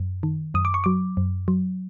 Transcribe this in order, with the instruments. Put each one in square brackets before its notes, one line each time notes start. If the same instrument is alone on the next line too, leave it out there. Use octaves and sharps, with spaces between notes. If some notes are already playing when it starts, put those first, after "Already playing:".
Already playing: [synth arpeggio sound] F#2
D#3
F#2 D#6
D6
C#6
F#3 D6
F#2
F#3